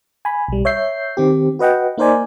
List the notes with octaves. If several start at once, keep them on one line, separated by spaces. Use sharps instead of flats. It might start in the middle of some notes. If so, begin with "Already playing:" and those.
G#5 B5
B1 G3
C#5 E5 G6 C7
D#3 C4 G4
F#4 B4 D#5 F#5 G5
A#3 D#4 A#4 C5 D5 G#5